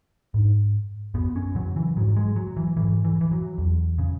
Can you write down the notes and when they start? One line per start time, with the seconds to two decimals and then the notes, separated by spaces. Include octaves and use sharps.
0.34 G#2
1.14 F#2 B3
1.36 C#4
1.55 C#3 F#3
1.76 E3
1.97 G#2 F#3
2.17 G#3
2.36 F#3
2.57 E3
2.77 G#2 E3
3.04 E3
3.21 E3
3.31 F#3
3.58 E2
3.98 C#3